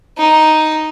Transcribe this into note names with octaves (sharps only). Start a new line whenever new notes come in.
D#4